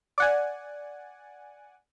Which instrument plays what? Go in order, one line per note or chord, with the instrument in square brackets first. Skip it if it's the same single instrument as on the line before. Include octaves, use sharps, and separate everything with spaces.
[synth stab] D5 F#5 G#5